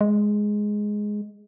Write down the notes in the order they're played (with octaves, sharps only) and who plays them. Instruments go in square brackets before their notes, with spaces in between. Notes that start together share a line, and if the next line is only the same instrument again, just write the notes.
[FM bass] G#3